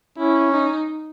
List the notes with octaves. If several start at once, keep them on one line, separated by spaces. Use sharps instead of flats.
C#4 E4
D#4